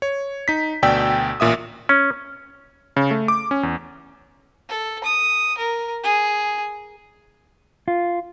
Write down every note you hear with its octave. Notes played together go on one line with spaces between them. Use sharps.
C#5
D#4 B6
D2 B2 D5 G5 E6 B6
A1 A#2 E5 D#6
C#4
C#3
A3
D6
C#4
E2
A4
D#6
A#4
G#4
F4